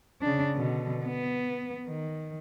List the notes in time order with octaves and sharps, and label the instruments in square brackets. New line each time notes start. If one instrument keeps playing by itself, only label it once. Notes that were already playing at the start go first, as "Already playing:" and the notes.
[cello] C#3 D4
B2 D3
B3
D#3